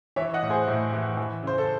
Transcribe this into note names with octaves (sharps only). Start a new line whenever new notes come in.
E3 C#5 E5
D#5 F#5
A2
G#4 C5
A2
E3
E3
C#3 C5
A4